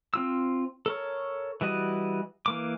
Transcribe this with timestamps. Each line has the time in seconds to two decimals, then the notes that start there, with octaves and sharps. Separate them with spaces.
0.14 C4 F4 E6
0.86 A4 A#4 C#5
1.61 E3 G3 F#4 D#5
2.46 E3 A#3 D6